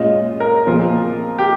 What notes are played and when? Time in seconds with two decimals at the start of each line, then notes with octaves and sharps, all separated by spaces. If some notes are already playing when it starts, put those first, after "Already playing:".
Already playing: A#2 G#3 C#4 F4 D#5
0.40 A#4
0.67 A#2 F3 C4 F4 G#4
1.38 G4